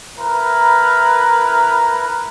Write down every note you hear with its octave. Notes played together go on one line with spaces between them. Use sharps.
E4 A#4 B4 A#5